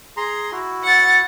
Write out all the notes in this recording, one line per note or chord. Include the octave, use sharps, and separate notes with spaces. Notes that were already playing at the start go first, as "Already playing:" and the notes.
G#4 A#5 C6
E4 F#4
F#5 A6